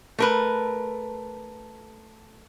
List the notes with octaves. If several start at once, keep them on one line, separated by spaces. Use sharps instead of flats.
A3 A#4 B4